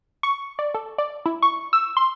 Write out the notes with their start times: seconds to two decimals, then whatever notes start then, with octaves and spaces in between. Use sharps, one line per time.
0.23 C#6
0.59 D5
0.74 A4
0.98 D5
1.26 E4
1.42 C#6
1.73 E6
1.97 C6